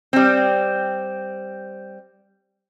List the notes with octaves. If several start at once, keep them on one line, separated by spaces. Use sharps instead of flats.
G3 C4